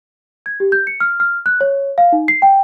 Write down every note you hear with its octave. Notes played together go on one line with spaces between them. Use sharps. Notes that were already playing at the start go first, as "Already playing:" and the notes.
G#6
G4
G6
C#7
F6
F6
F#6
C#5
F5
D#4
C7
G5